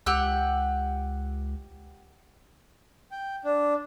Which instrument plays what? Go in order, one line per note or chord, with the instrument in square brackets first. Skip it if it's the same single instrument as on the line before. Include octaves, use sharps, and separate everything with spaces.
[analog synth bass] C#2 [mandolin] G4 F#5 E6
[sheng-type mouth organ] G5
D4